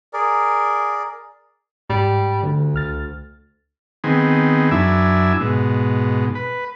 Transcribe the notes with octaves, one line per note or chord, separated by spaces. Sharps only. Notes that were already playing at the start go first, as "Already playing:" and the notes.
G#4 A#4 D5
G#2 G3
D2 D3
C#2 F6 A6
D#3 B3 C4 G#4
F#2 D4 E4 E5 G#5
G#2 B2
B4